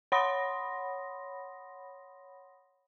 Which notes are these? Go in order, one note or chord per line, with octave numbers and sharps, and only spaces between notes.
C#5 F#5 B5 C6 D#6 A#6